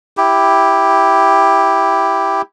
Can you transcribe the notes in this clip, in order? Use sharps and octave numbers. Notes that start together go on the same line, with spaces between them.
E4 G4